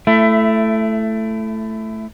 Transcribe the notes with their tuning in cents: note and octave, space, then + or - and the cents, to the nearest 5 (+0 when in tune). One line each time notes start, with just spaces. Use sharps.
A3 +0 E4 +25